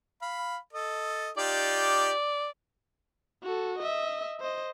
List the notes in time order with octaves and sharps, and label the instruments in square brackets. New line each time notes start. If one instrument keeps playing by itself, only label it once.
[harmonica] F5 B5
A4 D#5
[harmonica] D#4 F4 G4 [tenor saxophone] D5
[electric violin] F#4 A4
D#5 E5
C5 D#5